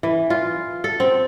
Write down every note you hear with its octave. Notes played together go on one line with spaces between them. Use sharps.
E3
F4
A4
C4